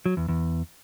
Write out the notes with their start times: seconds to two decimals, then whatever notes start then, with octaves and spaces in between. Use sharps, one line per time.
0.06 F#3
0.17 E2
0.29 E2